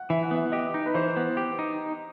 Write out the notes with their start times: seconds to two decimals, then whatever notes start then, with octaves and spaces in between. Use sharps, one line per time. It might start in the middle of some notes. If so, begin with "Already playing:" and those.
Already playing: F#5
0.10 E3 E5
0.23 F#5
0.31 B3 E5
0.52 G4 D#5
0.74 D#4
0.86 B4
0.94 E3 C5
1.17 B3
1.37 G4
1.59 D#4